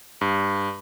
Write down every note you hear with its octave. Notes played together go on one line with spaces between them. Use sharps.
G2